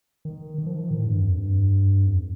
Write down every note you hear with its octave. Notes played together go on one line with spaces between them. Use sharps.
D#3
D#3
F3
D#3
A2
G2
F2
G2
F2